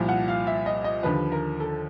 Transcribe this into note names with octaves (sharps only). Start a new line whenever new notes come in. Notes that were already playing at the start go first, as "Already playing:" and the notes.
Already playing: C2 A#2 F3
F#5
F5
E5
D#5
D#5
D#2 D3 F3 B4
A#4
A4